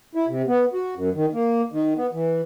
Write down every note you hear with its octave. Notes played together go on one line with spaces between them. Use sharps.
E4
C3
B3
F#4
F#2
D#3
A#3
D#3
B3
E3